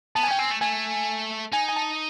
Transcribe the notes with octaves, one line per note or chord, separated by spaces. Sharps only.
B3 A5
G#5
C#4 G5
C4 G#5
A3
A3 G#5
D#4 G#5
G#5
A5